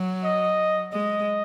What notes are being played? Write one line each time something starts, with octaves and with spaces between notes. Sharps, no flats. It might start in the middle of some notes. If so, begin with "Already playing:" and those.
Already playing: F#3
D#5
G#3 D#5